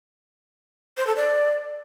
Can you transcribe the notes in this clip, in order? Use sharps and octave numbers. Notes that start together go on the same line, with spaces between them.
C5
A4
D5